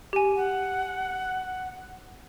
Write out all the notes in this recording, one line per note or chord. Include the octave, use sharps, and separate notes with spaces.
G4 G#5
F#5